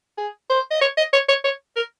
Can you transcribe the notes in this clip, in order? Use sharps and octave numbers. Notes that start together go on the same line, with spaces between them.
G#4
C5
D#5
C#5
D#5
C#5
C#5
C#5
A#4